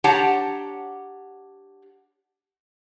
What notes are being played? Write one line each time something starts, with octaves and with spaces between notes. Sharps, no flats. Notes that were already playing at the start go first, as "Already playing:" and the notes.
D4 G4 C#5 F#5 A5 A#5